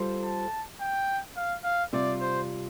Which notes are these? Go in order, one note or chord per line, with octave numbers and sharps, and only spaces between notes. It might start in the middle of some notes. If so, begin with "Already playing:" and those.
Already playing: G3 F4 A4 C5
A5
G5
F5
F5
C3 G3 F4 D5
C5